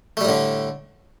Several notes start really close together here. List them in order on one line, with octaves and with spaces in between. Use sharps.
A3 G3 A2 D3